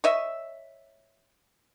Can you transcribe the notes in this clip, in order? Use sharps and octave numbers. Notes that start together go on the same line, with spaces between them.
C#5 D#5 E5